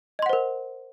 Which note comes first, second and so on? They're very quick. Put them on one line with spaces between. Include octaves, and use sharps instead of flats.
D#5 C6 F#5 C5 A#4